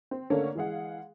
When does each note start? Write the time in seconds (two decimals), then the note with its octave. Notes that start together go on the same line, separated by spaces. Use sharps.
0.11 C4
0.30 D3 A3 A#3 C#4 D4 C#5
0.55 E3 G#3 G#4 F5 F#5